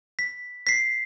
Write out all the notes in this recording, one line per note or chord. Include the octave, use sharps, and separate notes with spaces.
B6
B6 C7